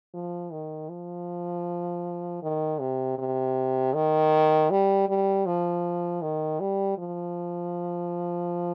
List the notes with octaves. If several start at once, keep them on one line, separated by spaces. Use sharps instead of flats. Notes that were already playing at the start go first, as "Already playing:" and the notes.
F3
D#3
F3
D#3
C3
C3
D#3
G3
G3
F3
D#3
G3
F3